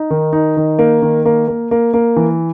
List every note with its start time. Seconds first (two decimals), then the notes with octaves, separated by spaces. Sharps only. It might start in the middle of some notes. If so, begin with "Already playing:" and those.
Already playing: D#4
0.10 D#3
0.33 D#4
0.57 D#3
0.79 A#3
1.02 D#3
1.25 A#3
1.48 A#3
1.71 A#3
1.94 A#3
2.17 E3